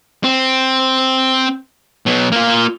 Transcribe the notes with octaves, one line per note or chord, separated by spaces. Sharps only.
C4
B2 F#3
A#3 F4